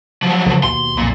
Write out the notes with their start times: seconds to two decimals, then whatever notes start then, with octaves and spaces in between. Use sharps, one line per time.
0.23 F3 F#3
0.46 C#2 D3 E3
0.64 D#2 B2 C6
0.97 B1 F2 A#2